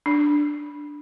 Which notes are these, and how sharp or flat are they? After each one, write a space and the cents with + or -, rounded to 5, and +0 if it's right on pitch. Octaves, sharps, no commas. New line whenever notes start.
D4 +5